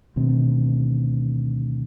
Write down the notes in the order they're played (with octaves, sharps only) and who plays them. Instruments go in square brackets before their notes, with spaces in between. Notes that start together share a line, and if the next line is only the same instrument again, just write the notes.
[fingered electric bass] D2 B2 D#3 C4